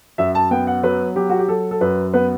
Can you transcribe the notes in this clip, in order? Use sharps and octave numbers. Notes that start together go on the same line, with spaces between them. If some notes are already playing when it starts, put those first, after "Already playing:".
F#2 E5
A5
B3 G5
F#5
F#3 B4
F#3 G4
F#4
G4
F#3 A4
A4
F#2 B4
B3 B4